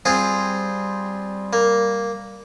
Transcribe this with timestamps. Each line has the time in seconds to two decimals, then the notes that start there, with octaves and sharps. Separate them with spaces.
0.05 G3 C4 F4 G#4
1.53 A#3